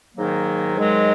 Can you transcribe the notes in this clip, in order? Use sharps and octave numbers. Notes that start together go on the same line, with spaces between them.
G#2 D#3 F#3 A#3
G#2 D#3 F#3 G#3